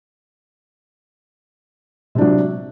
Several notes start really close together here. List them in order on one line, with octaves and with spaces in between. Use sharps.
C3 D4 F#3